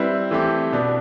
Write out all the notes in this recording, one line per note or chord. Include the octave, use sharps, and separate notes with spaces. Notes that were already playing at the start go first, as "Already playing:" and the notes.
Already playing: G3 C4 E4 B4
E3 A3 C4 G4
B2 B3 D4